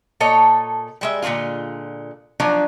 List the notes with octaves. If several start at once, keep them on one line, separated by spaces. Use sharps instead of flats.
A#2 A4 C#5 D#5
G3 G#3 E5
A#2 D3 E3 G#3 F4
F3 F#3 D4 D#4